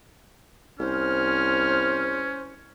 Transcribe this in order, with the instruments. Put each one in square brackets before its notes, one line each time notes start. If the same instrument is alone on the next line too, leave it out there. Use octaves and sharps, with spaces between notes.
[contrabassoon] C2 [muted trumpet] C#4 [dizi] C5 [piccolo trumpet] F6